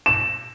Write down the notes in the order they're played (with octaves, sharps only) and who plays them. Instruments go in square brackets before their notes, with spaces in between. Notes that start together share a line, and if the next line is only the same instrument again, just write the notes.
[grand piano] E7